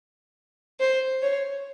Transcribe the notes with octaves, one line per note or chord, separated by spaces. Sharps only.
C5
C#5